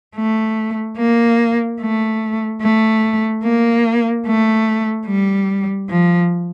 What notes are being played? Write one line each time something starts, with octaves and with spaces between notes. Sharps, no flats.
A3
A#3
A3
A3
A#3
A3
G3
F3